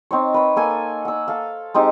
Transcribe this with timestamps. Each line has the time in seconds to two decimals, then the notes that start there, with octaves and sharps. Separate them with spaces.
0.11 C4 D#4 C#5
0.34 B4 C#5
0.56 A#3 A4 G#5
1.05 F#5 E6
1.28 A4 F5
1.74 G#3 C4 D#4 G4